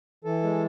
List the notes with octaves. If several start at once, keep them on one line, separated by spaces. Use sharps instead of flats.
E3 A4
G#3